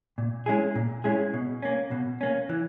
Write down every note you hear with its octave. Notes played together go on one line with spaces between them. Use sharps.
A#2
G#3 C#4 E4 G#4
A#2
G#3 C#4 E4 G#4
B2
A#3 C#4
B2
A#3 C#4
E3